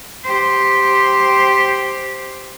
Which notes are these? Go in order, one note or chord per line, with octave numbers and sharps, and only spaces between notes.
G4 C5